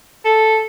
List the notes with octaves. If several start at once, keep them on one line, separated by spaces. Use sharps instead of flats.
A4